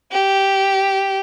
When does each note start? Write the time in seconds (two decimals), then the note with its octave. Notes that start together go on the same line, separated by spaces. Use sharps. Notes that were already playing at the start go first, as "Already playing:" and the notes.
0.12 G4